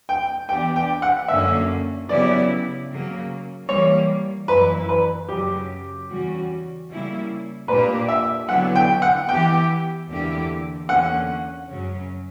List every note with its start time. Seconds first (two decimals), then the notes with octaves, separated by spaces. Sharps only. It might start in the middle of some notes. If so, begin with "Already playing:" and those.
0.09 G5
0.49 E3 B3 D4 G4 G5
0.76 G5
1.02 F#5
1.28 F#2 D3 A#3 C#4 E5
2.09 C#3 F#3 B3 E4 G4 D5
2.89 C#3 F#3 A#3
3.68 E3 G3 A#3 C#5
4.48 F#2 E3 A#3 E4 B4
4.89 B4
5.28 F#2 C#3 F#3 G4
6.08 E2 C#3 G3 C#4 F#4
6.88 C#3 G3 A#3 E4
7.68 A#2 A#3 D4 G4 B4
8.08 E5
8.49 D3 F#3 B3 E4 F#5
8.76 G5
9.02 F#5
9.29 E3 B3 E4 G4 G5
10.08 E2 D3 A#3 E4 G4
10.88 E2 D3 A#3 C#4 F#5
11.69 F#2 C#3 F#3 C#4